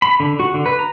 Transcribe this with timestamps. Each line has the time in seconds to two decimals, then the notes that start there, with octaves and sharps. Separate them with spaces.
0.02 B5
0.20 D3
0.40 F#4
0.54 D3
0.66 B4
0.79 A#5